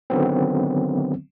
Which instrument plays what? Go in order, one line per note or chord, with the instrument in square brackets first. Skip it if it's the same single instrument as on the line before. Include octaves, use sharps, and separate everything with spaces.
[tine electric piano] D3 D#3 F#3 B3 C4